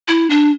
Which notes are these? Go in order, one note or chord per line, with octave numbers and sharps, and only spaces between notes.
E4
D4